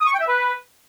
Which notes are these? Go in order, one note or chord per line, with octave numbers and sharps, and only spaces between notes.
D#6
C#6
G5
E5
B4